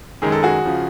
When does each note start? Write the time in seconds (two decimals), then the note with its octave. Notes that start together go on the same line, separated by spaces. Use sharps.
0.22 F#2 D#3 G#3 G#4
0.32 A4
0.43 F#4 G#4
0.65 C#3 F3